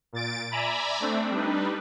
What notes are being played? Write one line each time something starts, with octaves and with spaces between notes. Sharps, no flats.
A#2 A6 D7
D5 E5 G#5 A#5 B5
A3 C4 D4
G3 D4 D#4 B4